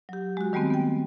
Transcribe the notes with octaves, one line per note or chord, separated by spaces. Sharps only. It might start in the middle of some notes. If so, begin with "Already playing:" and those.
F#3 G4
G#3 F#4
D#3 G3 A3 B3 C4
B3 G5